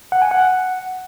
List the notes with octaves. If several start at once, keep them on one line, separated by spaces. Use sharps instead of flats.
F#5
G#5
F#5